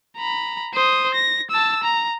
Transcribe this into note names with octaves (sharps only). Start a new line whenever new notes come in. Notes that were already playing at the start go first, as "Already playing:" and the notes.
A#5 B5
C5 D#6
A#6
A5 E6
A#5